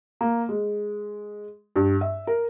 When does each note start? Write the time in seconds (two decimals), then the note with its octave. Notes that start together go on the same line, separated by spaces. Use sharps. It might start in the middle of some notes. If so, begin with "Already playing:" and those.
0.21 A#3
0.49 G#3
1.76 G2
2.01 E5
2.27 A#4